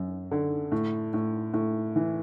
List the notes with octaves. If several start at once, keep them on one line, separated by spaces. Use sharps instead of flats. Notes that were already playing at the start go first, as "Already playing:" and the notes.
Already playing: F#2
D3
A2
A2
A2
E3